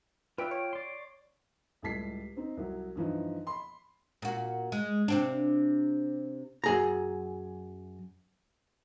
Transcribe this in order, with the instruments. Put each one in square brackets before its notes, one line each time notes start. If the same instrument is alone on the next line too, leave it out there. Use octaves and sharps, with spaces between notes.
[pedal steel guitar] F4 G5 [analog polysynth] B4 D5 E5
[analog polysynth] C#5
[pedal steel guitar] D5 C6
[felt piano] C#2 A2 G3 A5 B6 C7
C4 D#4
C2 F#3
G2 E3 F3 D#4
B5 C6
[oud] A#2 F#4
G#3
C3 C4 D4
[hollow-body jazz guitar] F#2 G#4 A#5